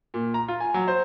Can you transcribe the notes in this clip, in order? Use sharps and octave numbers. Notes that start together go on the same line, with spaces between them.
A#2
A#5
F4
G#5
F#3
C5